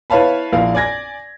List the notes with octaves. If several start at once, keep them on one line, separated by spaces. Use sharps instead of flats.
E4 B4 C#5 F5 A5 B5
A#1 A#3 E4 F5
D5 G#5 G#6 A#6